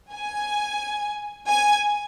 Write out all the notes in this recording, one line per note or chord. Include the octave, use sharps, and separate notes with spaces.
G#5
G#5